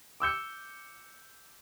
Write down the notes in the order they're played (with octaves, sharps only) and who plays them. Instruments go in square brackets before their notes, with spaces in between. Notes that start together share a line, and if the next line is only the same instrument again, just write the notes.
[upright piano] D6 E6 G6 C#7